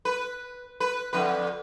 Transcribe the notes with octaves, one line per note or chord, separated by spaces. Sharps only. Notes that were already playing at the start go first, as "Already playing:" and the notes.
B4
B4
F2 D3 B4